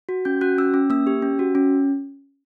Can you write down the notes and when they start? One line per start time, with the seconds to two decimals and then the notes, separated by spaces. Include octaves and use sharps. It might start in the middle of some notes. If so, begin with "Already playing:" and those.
0.09 F#4
0.25 C#4 G6
0.41 F#4 F#6
0.58 C#4 E6
0.74 C#4
0.90 A#3 E6
1.07 G4
1.22 C#4
1.39 F#4
1.55 C#4